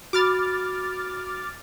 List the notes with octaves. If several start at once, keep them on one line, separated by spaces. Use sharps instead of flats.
F#4 B5 D6 F6 A6